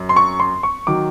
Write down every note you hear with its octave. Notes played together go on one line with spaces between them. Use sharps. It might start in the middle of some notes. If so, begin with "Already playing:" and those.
Already playing: F#2
C6
C#6
C6
C#6
D#3 F#3 D6